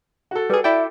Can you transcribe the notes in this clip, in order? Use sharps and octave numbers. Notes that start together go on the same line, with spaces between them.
F#4 A4
G3 G#4 B4
E4 D5 E5 G5